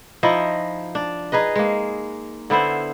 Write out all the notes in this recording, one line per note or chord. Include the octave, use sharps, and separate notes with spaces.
F3 D#4 E4 D#5
D4
D#4 G#4 B4 D#5
G#3 A#3
D3 B3 E4 C5